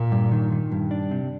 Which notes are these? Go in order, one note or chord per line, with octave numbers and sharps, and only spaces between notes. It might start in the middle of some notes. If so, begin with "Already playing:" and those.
Already playing: A#2
G2
D#3
D#3
G2
D4
C3